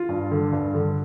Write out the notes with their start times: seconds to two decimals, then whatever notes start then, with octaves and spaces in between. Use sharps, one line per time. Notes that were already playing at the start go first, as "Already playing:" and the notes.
Already playing: F4
0.09 G2
0.31 D3
0.52 G2
0.74 D3